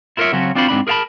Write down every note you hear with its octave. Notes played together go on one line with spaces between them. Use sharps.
E4 F4 A#4 B4 C#5 E5
C#3 F#3 C4 C#4 F#4
C4 D4 F4 F#4 C5 B5
G#2 C4 D4 B5
G#4 A#4 C5 F5 A5 B5